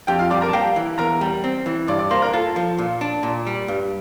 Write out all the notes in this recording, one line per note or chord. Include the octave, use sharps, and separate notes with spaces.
F2 G4 G5
F4 F5
G3 D5 D6
A#4 A#5
A5
A#3 G4 G5
E3
E2 A#4 A#5
G3
C4
E3
G2 D5 D6
D5 D6
A#3 C5 C6
A#4 A#5
F4 A4 A5
F3
A#2
D4
A#2
G3
G2